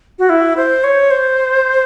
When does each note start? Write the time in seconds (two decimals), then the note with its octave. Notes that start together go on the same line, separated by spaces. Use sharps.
0.19 F#4
0.29 E4
0.57 C5
0.84 C#5
1.11 C5